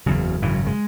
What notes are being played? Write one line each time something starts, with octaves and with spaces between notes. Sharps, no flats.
F#1 E2 C#3 F#3
G#1 F#2 C#3 E3
F#3
G#3